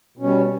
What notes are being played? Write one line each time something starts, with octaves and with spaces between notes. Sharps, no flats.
B2 G3 C#4